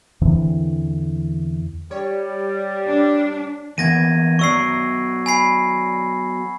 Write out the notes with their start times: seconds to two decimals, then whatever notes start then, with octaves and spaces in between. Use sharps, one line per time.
0.21 E2 D3 E3 C4
1.91 G3 C#5
2.88 D4
3.78 E3 A#3 B3 G#6 A#6 D#7
4.39 F#3 B3 D5 C#6 E6 C7
5.26 G#5 B5 C7